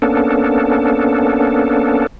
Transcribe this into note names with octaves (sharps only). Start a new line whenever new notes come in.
A#3 B3 C#4 D4 A4